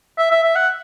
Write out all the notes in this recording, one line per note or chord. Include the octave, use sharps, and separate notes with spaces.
E5
E5
E5
F#5